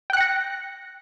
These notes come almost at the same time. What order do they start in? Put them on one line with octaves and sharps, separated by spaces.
G5 F#6 C#7 A#6